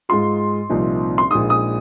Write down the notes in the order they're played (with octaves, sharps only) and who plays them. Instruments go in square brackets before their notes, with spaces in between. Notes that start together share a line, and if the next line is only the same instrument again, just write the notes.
[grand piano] G#2 G#3 F4 [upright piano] C6
[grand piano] C2 A#2 F3 C4 D#4
[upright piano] C6
[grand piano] A#1 A#2 G#3 D#4 [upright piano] D#6
[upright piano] D#6